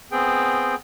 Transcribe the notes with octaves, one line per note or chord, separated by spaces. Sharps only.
B3 C4 G#4 G5